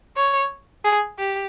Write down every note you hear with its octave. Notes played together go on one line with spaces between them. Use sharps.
C#5
G#4
G4